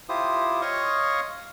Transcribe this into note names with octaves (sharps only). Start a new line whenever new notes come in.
E4 F4 G4 C5 D#6
C#5 D#5 F5 C6 C#6 D#6